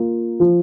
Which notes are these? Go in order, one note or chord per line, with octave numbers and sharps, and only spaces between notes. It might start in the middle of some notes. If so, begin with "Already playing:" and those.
Already playing: A#3 F4
F3